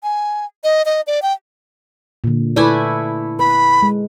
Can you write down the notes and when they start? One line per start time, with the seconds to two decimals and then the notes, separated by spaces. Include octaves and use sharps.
0.03 G#5
0.64 D#5
0.85 D#5
1.07 D5
1.22 G5
2.24 A#2 D3
2.56 A3 E4 B4 D5 G#5
3.39 B4 B5
3.83 G#3